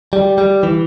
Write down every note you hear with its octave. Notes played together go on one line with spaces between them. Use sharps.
G3
G3
E3